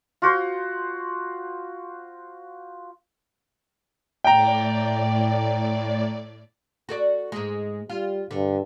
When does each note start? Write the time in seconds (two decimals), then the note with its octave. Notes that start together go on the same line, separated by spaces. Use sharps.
0.22 F4 F#4 C5
4.24 A2 D5 G5 A#5
6.89 F#4 A4 D5
7.32 G#2 G#3
7.90 G3 F4
8.31 G2 D3